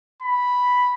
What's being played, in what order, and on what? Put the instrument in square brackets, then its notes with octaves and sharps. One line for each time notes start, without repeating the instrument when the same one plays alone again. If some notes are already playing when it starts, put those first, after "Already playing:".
[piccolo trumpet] B5